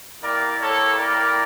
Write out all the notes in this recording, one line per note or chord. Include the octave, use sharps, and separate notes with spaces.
A#3 E4 G4 A#4 D5
A4 C#5
A#4 D5